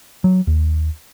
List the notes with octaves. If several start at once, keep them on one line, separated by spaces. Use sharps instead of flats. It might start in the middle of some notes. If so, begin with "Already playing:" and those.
F#3
D#2